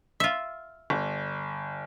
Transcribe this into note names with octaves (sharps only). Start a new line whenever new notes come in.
F4 E5
G1